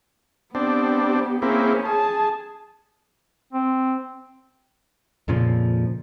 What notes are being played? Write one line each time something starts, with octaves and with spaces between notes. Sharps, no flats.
B3 C4 D4 G4
A#3 C4 C#4 E4 G#4
G#4 A5
C4
F2 A#2 C#3 F3